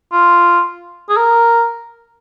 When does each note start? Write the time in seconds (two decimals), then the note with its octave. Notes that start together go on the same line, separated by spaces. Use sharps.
0.12 F4
1.09 G#4
1.17 A#4